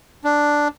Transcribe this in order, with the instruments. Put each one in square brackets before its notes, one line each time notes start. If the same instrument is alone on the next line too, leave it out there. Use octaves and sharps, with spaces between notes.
[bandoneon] D4